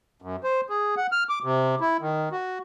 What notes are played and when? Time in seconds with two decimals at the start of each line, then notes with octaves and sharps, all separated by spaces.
0.22 F#2
0.44 C5
0.70 G#4
0.97 F#5
1.12 F6
1.29 D6
1.44 C3
1.80 E4
2.01 D#3
2.32 F#4